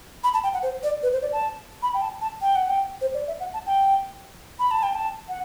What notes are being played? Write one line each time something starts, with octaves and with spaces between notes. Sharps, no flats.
B5
A5
G5
F#5
C5
D5
B4
C5
D5
A5
B5
G5
A5
A5
G5
F#5
G5
C5
D5
E5
F#5
A5
G5
B5
A5
G5
A5
F#5